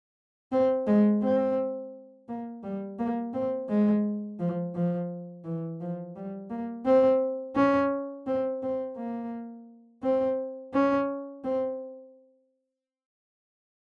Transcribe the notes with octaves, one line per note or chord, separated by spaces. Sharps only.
C4
G#3
C4
A#3
G3
A#3
C4
G#3
F3
F3
E3
F3
G3
A#3
C4
C#4
C4
C4
A#3
C4
C#4
C4